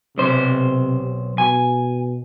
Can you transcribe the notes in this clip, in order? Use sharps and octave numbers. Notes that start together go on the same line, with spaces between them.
B1 C3 C5
B2 G#5